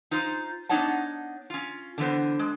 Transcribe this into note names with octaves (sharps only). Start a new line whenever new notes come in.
D#4 F4 C5
B3 D4 D#4 C#5 F#5 A5
C#4 F4
D3 E3 B3 C5
G#3